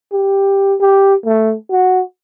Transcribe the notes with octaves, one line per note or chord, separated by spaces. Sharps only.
G4
G4
A3
F#4